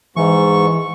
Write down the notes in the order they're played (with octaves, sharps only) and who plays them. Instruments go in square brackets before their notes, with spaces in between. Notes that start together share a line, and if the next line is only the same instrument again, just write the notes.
[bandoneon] G#2 C#6 [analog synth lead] E3